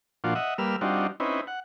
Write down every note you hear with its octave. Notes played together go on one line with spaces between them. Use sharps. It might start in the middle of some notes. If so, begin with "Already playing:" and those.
A#2 F3 D4 F4 F#4
D#5 E5 F#5
G3 A#3 B4 E6 F6
G3 C4 D4 D#4 F4 F#4
C4 C#4 D#4 E4 B4
F#5